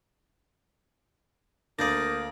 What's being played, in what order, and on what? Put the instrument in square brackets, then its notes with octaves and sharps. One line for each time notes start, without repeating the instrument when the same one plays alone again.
[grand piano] D2 [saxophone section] A#3 [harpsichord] D4 D5 [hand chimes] D#6 G6 A#6